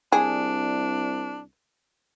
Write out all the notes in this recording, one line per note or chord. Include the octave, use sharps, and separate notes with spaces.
C2 D4 G#4